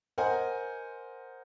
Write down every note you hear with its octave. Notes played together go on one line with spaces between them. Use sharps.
A#4 C5 D#5 F#5 G#5